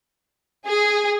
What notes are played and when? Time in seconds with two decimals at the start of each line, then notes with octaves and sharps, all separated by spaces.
0.67 G#4